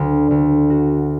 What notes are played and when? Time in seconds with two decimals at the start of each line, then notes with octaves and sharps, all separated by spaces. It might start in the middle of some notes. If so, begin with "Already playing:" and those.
Already playing: D2
0.31 D2
0.70 F#4